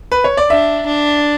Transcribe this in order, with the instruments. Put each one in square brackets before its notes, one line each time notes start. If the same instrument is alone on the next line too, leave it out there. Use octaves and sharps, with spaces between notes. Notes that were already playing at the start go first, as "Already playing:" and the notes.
[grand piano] B4
C#5
D5
[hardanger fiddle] D4 [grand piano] E5
[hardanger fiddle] D4